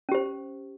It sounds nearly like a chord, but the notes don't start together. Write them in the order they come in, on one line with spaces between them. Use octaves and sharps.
C#4 G4 C5